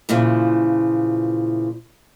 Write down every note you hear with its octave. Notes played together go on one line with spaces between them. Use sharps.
A#2 C#3 E3 F3